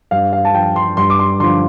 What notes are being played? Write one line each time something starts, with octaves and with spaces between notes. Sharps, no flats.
G2 F5
F5
A5
F3 G5
C6
G2 C6
D6
C6
D3 F3 C6